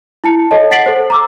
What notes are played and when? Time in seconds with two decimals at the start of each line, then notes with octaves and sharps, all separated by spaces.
0.24 E4 A5 C#7
0.51 A4 C#5 D#5 A5
0.71 F#5 A6 B6 C7 D7 F#7
0.86 A4 C5
1.10 A#5 D6 E6